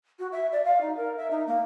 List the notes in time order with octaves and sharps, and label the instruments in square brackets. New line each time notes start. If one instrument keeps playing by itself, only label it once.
[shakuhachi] F#4
E5
D5
F5
D#4
A#4
E5
D#4
A#3